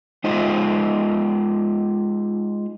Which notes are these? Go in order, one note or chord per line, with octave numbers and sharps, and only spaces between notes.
G#3 D#4 F4 C5 D#5